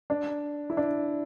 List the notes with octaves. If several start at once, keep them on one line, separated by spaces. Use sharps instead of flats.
D4
E4
D4